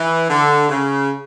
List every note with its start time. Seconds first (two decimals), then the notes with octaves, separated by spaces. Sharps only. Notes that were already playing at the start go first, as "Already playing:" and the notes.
Already playing: E3
0.30 D3
0.69 C#3